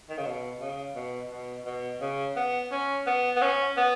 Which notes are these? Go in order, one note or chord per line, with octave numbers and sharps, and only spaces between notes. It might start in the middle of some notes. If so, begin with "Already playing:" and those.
D#3
C#3
B2
C#3
B2
B2
B2
C#3
B3
C#4
B3
B3
C#4
B3